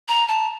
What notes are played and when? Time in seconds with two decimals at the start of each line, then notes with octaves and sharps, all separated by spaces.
0.08 A#5
0.28 A5